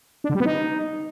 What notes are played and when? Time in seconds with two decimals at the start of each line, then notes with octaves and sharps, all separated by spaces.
0.24 D4
0.30 D3
0.35 G3
0.40 B3
0.46 D#4